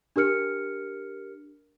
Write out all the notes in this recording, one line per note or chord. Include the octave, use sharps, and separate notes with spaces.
D4 G4 A#4 F6 C#7